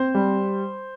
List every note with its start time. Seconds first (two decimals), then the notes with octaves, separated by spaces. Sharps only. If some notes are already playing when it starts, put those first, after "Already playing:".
Already playing: C4 C5
0.15 G3